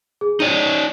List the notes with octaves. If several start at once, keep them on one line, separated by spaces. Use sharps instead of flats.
G#4
D#4 C#5 D5 D#7